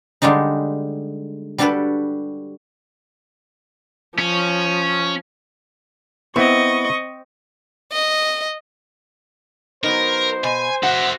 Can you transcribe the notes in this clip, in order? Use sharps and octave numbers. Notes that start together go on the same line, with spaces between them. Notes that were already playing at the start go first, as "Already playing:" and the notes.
D3 G3 G#3 D4 D#4
G3 D4 F#4 G4 A4 B4
F3 C#4
B3 C4 E4 B4 D#5 C#6
D#5
F#3 B3 D#4 A#4 C5
B2 G#5
F#4 E5 F#5